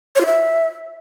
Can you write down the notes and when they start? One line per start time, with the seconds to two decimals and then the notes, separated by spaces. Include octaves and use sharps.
0.16 C#5
0.21 F4
0.26 E5